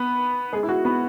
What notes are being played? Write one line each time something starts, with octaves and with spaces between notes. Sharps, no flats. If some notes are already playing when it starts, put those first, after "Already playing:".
Already playing: B3 B4
G#3 G#4
E4
F#4
B3 B4